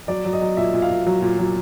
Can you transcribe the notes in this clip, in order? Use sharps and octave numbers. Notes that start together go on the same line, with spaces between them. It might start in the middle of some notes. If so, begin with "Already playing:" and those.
F#3 D5
F#3
D#5
F#3
A#2 E5
A#2
F5
A#2
F#3
A#2
F#3